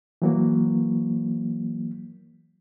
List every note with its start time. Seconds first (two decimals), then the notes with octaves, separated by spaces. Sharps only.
0.22 E3 F#3 A#3